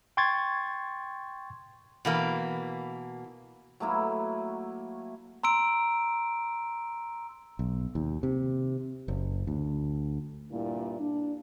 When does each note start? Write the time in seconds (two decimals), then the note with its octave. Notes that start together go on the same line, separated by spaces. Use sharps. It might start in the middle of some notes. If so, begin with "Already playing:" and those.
0.17 G5 C6 C#6 G#6 A6
2.05 B2 E3 A#3
3.80 F#3 A3 A#3 E4
5.44 A#5 C6 E6 D7
7.59 B1
7.95 D#2
8.23 C3
9.08 F#1
9.47 D2
10.52 G2 A#2 A#3 E4
11.00 D4